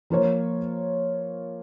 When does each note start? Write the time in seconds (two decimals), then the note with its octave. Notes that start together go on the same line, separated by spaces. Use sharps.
0.10 F3 A#3 F4 A#4 C#5